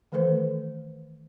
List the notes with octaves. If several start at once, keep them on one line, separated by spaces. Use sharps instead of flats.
D#3 E3 A3 A4 B4 C5